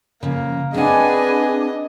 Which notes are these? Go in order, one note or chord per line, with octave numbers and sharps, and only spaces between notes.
C#3 F3 A#3
C4 D4 G#4 B4 D#5 F#5 G#5